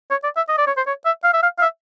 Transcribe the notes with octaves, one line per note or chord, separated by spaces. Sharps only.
C#5
D5
E5
D#5
D5
C#5
C5
C#5
E5
F5
E5
F5
F5
E5